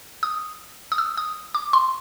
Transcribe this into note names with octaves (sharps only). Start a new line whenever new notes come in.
D#6
D#6
E6
D#6
D6
C6